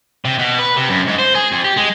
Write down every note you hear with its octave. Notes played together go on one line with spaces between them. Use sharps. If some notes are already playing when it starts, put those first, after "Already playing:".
C3
B2
B4
C3
F#2
G#2
C5
G#4
F2
G4
G#3